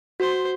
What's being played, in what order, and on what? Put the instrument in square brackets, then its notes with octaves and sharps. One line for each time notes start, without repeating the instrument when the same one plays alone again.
[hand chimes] F#4 [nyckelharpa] C5